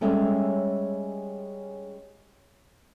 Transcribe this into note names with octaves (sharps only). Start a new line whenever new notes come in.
G3 G#3 C#4 A4 C#5 E5